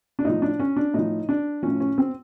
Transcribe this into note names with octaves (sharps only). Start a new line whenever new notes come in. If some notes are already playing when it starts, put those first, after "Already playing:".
D4
A2 F3 D#4
D4
C#4
D4
A2 F3 D#4
D4
A2 F3 C#4
C#4
C4